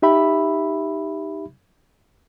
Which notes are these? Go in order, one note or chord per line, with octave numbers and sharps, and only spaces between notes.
D#4 G4 E5 B5